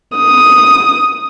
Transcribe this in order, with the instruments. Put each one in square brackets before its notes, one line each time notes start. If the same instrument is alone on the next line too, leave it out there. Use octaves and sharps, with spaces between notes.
[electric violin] D#6